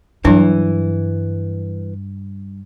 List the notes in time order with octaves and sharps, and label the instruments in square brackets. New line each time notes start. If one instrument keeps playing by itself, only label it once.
[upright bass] G2 [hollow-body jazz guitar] E3 [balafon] F#3 D4